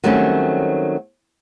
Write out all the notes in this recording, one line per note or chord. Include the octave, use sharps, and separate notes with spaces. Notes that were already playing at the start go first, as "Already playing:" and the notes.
D#3 F#3 G3 A3 C4 C#4